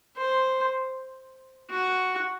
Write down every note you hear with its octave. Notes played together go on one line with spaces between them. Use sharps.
C5
F#4